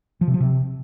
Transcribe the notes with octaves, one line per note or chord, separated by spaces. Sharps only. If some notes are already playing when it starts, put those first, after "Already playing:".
F3
C3
F3
C3